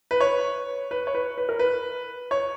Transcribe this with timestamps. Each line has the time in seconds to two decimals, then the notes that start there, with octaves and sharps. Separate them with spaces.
0.11 B4
0.21 C#5
0.91 B4
1.07 C#5
1.15 B4
1.38 B4
1.49 A#4
1.59 B4
2.31 C#5